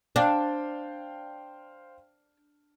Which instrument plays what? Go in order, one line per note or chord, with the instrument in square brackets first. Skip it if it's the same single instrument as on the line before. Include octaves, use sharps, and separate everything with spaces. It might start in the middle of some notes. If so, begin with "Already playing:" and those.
[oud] D4 [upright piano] C5 F5 G5